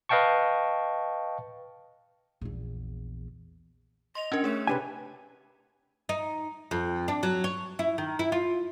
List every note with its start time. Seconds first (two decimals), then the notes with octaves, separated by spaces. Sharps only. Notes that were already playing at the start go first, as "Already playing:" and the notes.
0.09 B4 D#5 F5 G5 A5 C#6
2.41 A#1 E2
4.15 D#5 C6 F7
4.32 C#4 D4 A#4 G#6
4.44 A3 G#4 C#5
4.67 C3 D4 G4 B4 G#5
6.09 D#4
6.71 F2
7.08 D4
7.23 F#3
7.44 C#5
7.79 E4
7.98 D#3
8.19 E4
8.32 F4